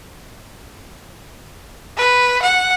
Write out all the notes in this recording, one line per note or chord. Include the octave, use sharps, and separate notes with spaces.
B4
F#5